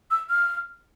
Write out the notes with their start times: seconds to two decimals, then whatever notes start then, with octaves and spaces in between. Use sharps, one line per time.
0.11 E6
0.30 F6